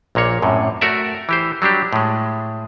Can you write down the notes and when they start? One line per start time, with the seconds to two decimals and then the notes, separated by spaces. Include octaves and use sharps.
0.15 A#1 A#2 A#3 C#5
0.42 F#2 A2 C3
0.81 A3 F#4 A#4 D5 E5
1.29 E3 G4 C5
1.62 F#3 G3 D4 G4
1.93 A2 G#3